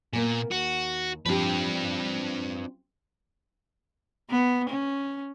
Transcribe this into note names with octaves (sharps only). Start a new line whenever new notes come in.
A#2 A#3 B3 G#5
D#2 F#4
F3 C4 D4 G4 B4
B3
C#4